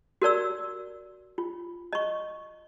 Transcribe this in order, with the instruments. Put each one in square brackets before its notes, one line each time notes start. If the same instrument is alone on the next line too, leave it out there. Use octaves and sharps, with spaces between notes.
[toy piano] F#4 A#4 D5 E6
F4
D#5 C#6